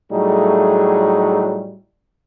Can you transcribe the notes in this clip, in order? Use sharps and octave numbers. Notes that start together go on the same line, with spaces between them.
A2 F#3 G3 A3 D#4 G#4